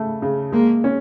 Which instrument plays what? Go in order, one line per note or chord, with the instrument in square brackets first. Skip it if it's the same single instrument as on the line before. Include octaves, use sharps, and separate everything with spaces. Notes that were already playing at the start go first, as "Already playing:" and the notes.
Already playing: [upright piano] C#3 A3
C#3
[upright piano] G#3 [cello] A#3
[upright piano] C#4